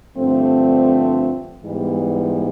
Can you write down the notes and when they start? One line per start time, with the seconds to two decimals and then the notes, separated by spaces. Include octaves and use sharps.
0.16 G2 D3 F3 A3 C4
1.63 G#2 E3 G3 B3